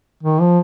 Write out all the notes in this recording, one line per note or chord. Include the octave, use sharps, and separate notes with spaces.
D#3
F3